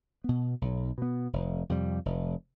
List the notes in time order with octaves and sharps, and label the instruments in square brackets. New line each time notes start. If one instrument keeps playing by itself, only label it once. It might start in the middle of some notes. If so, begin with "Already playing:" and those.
[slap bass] B2 B3
B1
B2 B3
F1
F2 C3 G3
F1